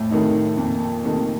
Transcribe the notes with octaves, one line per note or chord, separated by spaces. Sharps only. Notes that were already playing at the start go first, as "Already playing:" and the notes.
Already playing: F2 A2
C3 D#3 A3 D#4
F2 A#2
C3 D#3 A3 D#4